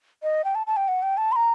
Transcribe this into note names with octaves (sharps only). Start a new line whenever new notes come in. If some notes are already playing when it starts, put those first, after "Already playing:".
D#5
G5
A5
A5
G5
F#5
G5
A5
C6
A#5